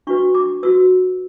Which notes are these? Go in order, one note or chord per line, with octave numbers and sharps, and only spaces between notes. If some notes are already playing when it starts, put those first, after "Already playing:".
D4 F#4 B4 C#6
D6
F#4 B4 E6